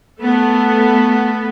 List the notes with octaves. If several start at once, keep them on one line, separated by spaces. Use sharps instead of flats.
A3 B3 A4